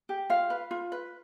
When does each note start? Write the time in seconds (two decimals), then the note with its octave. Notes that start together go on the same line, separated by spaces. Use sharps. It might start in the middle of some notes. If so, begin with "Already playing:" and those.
0.09 G4
0.30 F4 F5
0.50 B4
0.71 F4
0.92 B4